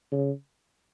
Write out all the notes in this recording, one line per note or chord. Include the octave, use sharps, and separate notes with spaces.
C#3